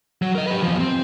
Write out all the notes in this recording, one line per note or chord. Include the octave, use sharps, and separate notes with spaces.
F#3
A#4 D#5
G4 B4
E2 F3
C4